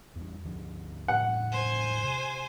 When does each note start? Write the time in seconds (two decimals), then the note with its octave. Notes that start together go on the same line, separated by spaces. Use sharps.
0.15 E2 G3
0.45 D2 F3
1.08 E1 A2 G3 F#5
1.52 C5 G#5
2.03 C3